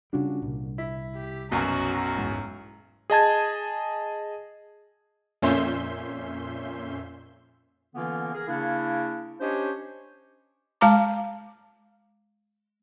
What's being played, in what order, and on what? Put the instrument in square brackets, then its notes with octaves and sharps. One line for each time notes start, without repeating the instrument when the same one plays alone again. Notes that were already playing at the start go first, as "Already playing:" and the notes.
[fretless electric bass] C#3 G3 [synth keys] D4 F4 F#4
[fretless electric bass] C2 [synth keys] A#2
[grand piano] E4 [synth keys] B6
[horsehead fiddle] G4
[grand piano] B1 F#2 B2 [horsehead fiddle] F#4 A#5
[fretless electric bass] E1 G#2 E3
[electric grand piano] G#4 D#5 A5 G#6
[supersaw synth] F2 A#2 C#4 E5 C6 G6
[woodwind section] D3 E3 A#3 B3 C#4 F4
G#4 A#4
C#3 A#3 D4 E4
C#4 D4 G4 C5 C#5 D#5
[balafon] G#3 F5 A5 A#5 D6